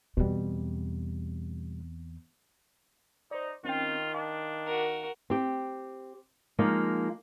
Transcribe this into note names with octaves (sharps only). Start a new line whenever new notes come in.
E2 B2 G3 C4
D#4 C5 D5
D#3 C4 C#4 F4 G5
D4 F5
F#4 A#4
C4 G4
F3 G#3 A#3 D#4